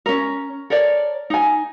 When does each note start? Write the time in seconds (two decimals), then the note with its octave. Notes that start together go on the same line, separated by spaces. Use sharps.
0.06 C#4 A#4
0.70 A4 A#4 C#5 D5
1.30 D#4 G#5